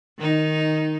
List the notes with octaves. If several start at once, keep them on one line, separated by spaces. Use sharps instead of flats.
D#3 D#4